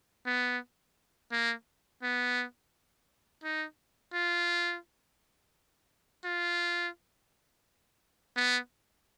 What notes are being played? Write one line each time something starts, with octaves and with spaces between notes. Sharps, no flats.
B3
A#3
B3
D#4
F4
F4
B3